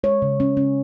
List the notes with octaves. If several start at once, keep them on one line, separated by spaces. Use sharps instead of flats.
G#3 C#5
C#3
C#4
C#4